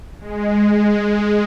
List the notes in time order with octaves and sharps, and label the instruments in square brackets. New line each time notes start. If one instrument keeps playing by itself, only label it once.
[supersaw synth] G#3